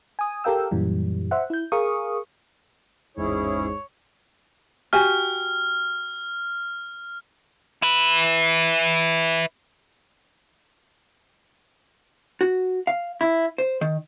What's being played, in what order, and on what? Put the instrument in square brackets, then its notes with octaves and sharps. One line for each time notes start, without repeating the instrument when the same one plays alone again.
[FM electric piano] G#5 D#6
G4 A4 A#4 F5 G5 E6
F#2 A#2 E3 G3
C5 E5 F#5
E4 G6
G#4 A#4 F5 C#6 D#6
[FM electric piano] A1 E2 [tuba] G#2 [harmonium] C#4 E4 G#4 [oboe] C#5
[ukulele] F#4 G4 G#5 [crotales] F6
[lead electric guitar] E4 B4
[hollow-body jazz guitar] F#4
F5
E4
C5
D#3